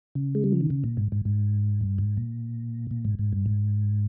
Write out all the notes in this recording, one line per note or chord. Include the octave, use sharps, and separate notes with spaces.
C#3
G#3
G3
F3
D#3
C#3
A#2
G#2
G#2
G#2
G2
G#2
A#2
A#2
G#2
G#2
G2
G#2